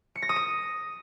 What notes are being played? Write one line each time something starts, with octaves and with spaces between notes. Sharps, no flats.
C#7
A#6
D#6
D#7